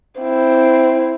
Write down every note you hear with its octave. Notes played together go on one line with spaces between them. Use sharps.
C4 E4